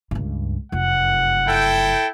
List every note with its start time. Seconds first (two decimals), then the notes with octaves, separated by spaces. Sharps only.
0.11 C#2 G2
0.72 F1 F#2 F#5
1.48 E4 A4 G5